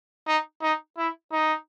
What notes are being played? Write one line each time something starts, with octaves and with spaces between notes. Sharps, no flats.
D#4
D#4
E4
D#4